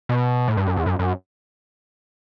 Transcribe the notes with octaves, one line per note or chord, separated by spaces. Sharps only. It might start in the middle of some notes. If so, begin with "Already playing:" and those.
B2
A2
G2
F#2
E2
F#2
F#2